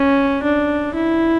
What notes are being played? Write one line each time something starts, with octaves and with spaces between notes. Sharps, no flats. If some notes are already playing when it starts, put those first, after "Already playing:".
Already playing: C#4
D4
E4